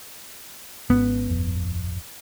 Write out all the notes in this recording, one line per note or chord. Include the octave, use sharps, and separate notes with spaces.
G#1 G#2 B3 C#4
D1 G1 F2